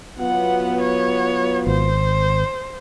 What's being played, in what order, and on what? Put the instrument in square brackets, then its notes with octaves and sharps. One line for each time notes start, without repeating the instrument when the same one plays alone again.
[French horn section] F#3 B3 F4 [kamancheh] F#5
[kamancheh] C#5
[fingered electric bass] G#1 [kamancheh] C5